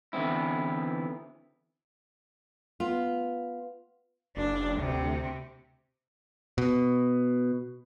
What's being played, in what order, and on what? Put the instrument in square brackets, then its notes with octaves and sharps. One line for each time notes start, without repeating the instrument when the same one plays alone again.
[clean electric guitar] D3 E3 B3 C4 E4
[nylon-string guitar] B3 F4
[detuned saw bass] F#1 [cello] D4
[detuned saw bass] D2 [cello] C3
[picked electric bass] B2